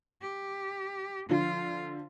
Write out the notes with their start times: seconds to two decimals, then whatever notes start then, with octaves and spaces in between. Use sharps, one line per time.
0.22 G4
1.30 D3 F3 F4